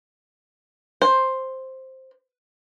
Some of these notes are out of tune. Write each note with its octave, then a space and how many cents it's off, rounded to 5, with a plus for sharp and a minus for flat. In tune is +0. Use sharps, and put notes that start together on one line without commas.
C5 +5